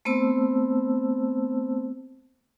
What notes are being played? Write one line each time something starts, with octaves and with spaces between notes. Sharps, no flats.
A3 B3 C4 C5 A5 E6